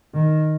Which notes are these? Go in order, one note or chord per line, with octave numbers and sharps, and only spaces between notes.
D#3